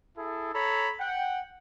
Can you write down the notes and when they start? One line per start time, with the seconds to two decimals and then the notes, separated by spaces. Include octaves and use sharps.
0.17 E4 G#4 A4
0.54 A4 C#5 A#5 B5
1.00 F#5 G5